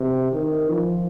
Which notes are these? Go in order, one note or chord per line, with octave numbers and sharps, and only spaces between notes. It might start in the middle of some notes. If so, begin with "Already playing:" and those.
Already playing: C3
D#3
F3